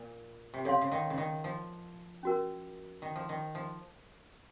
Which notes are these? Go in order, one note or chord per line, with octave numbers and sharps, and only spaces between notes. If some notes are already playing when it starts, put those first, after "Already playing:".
Already playing: A#2
C3
C#3 A4 C#5 F5 C6
C#3
D#3
C#3
D#3
F3
C#4 F#4 A#4
D#3
F3
D#3
F3